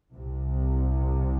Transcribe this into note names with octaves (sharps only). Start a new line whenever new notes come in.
C2 C3